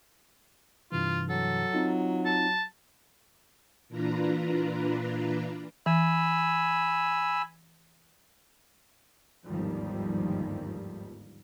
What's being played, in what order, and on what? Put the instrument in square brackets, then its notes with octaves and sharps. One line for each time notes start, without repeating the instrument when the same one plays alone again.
[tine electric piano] G2 C3 E3 [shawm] F4
[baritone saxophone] F#3 [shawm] A4
[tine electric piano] C4 D#4 F4
[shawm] A5
[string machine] A#2 E3 D4 F4 B4 A#5
[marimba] E3 [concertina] G#5 B5 E6
[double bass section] G1 D#2 G#2 D#3 F3 G3